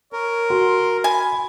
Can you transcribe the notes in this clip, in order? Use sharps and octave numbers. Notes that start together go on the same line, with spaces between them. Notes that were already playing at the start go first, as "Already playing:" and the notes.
A#4 C#5
F#4 C6
G#5 B5